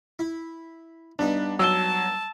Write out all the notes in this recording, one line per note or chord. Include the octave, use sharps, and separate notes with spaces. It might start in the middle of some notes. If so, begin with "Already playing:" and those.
E4
G2 B3 D4 D#4
F#3 A5 E6 G7